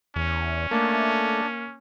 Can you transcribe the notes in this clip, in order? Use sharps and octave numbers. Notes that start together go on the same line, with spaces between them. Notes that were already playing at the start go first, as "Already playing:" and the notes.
E2 C#4
A3 A#3 D4 A5